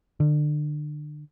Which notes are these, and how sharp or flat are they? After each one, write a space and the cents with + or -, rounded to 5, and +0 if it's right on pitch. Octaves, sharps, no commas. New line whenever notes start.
D3 +30